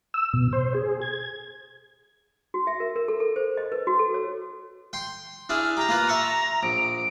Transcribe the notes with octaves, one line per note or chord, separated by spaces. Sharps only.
E6
B2
C5
G#4
G#6
F#4
E5
A#4
A#4
A4
A4
C5
D#5
B4
F#4
A4
C#5
G5 C6
D4 E4 G#4 F6
G4 G5 A#5
A#3 F4 B4
E5 A5 C#6
A#1 D7